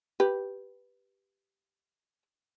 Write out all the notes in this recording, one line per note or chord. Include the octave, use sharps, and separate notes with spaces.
G4 B4